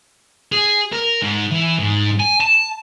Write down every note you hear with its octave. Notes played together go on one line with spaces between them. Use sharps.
G#4
A#4
G#2
E3
G#2
G#5
A5